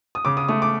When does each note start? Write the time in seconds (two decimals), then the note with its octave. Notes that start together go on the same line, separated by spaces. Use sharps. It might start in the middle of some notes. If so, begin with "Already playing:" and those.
0.15 D#6
0.25 C#3 D6
0.37 D#6
0.49 A3 D#6
0.62 D6